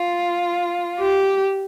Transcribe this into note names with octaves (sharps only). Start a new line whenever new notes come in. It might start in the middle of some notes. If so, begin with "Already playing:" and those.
Already playing: F4
G4